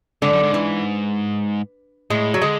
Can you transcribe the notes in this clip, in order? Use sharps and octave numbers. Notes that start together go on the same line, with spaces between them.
G#2 D3
F#2
G#2
E3
A2 G#3
F#3
D3 G#3